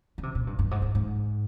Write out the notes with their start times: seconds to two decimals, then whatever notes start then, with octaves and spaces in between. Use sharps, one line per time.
0.18 D3
0.23 C3
0.35 A#2
0.47 G2
0.59 G2
0.71 G#2
0.82 G#2
0.95 G#2